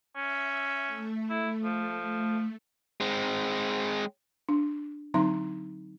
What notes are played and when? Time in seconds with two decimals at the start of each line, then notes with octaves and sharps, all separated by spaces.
0.16 C#4 E5
0.86 A3
1.30 E4
1.64 F3
3.01 G#3 C4
4.49 D4
5.14 D3 F#3 C4 D#4 A#5 C6